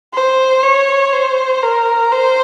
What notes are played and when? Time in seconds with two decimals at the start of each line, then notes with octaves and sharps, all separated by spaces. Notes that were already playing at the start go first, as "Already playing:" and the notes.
0.13 C5
0.63 C#5
1.13 C5
1.63 A#4
2.12 C5